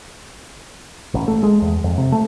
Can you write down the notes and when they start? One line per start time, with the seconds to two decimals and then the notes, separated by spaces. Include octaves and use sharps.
1.14 A1
1.28 A3
1.43 G#3
1.62 E2
1.84 F2
1.98 C3
2.12 A3